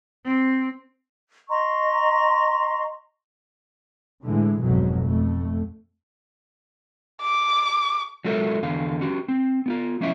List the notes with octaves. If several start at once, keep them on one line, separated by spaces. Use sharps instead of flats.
C4
D#5 A#5 C6 C#6
A2 D3 E3 G#3
F#1 B1 F2 G#2 B2 F#3
F2 A3
D6
F#3 G#3 F4 A4 A#4 E5
E2 D3 D#3 F5
C#4 F#4 G4
C4
B3 E4 F4
F3 A#3 C#4 E4 E5